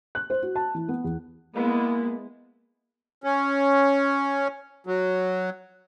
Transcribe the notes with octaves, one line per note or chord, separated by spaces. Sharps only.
F#6
C5
F#4
A5
E3
B3
E2
G#3 A#3 B3 E4
C#4
F#3